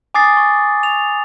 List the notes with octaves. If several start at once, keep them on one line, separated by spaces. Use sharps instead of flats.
G#5 D6 D#6 A6 C7
C#6
F7